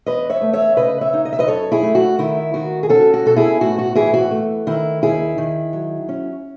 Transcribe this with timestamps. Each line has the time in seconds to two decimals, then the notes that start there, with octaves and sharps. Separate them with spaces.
0.06 E2 B4 D#5
0.30 C#5 E5
0.42 A3
0.53 C#5 E5
0.77 C#3 B4 D#5
1.01 C#5 E5
1.13 D#4
1.25 D#5
1.33 E5
1.39 B4 D#5
1.48 F#2 A4 C#5
1.72 E4 G#4
1.83 A3
1.95 F#4
2.19 D#3 E4
2.54 D#3 F#4
2.83 G#4
2.89 C#4 F#4 A4
3.14 F#4
3.26 B2 A4
3.36 E4 G#4
3.61 A2 F#4
3.79 F#4
3.95 E3 E4 G#4
4.14 F#4
4.31 A3
4.67 D#3 E4
5.02 D#2 E4 G#4
5.38 D#3
5.73 F#3
6.09 C#4